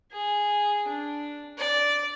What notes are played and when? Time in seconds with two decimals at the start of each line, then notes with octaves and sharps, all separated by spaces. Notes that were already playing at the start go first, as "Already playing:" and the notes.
0.12 G#4
0.88 D4
1.58 D5